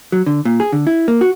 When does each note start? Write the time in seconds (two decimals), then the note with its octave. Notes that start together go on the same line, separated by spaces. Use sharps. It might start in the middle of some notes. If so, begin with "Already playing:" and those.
0.12 F#3
0.26 D3
0.45 A#2
0.60 G#4
0.73 D3
0.87 E4
1.08 A#3
1.21 F#4